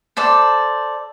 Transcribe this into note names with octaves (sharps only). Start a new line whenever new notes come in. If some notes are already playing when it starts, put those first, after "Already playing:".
A4 C5 D5